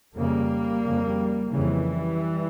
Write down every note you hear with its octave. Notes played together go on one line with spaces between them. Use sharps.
F2 C#3 G3 A#3
F2 C#3
F2 C#3 E3 G3